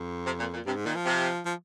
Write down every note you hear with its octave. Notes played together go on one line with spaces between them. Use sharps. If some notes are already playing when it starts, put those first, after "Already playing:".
Already playing: F2
C3
A#2
A#2
G2 C3
G#2
A#2 D#3
F3
C3
F3